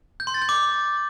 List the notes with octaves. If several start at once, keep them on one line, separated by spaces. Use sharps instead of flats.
G6
C6
A6
G6
D6